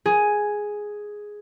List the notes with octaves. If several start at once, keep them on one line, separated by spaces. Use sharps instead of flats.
G#4